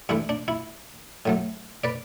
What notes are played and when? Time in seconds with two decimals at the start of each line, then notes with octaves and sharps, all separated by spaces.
0.09 G2 E3 A3 E4
0.29 D4
0.48 E4
1.25 A2 F#3 A3
1.84 B4 D5